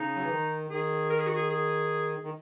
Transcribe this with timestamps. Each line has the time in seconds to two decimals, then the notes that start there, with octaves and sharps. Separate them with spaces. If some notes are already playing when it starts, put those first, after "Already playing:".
Already playing: C#3 D#4
0.16 F#3
0.23 E3
0.31 D#3
0.70 D#3 G#4
1.10 A#4
1.19 G#4
1.27 F#4
1.36 G#4
1.50 G#4
2.24 D#3